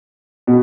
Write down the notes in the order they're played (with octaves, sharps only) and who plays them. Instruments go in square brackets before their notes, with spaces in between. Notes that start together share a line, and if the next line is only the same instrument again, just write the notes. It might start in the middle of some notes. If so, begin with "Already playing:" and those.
[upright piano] B2